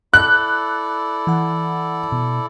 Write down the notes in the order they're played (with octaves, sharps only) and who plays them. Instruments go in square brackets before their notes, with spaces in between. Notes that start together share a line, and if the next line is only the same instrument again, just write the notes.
[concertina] E4 A4 D5 [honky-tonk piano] F#6
[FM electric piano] E3 F#5
B2